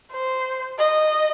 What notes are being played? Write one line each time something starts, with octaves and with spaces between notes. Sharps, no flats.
C5
D#5